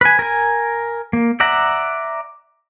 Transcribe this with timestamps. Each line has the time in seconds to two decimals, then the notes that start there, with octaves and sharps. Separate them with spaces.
0.01 B4 G#5
0.19 A#4 G#5
1.13 A#3
1.40 D5 E5 F#5 A#5